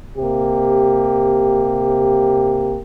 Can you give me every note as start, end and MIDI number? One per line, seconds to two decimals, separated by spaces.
0.18 2.80 48
0.18 2.80 58
0.18 2.80 67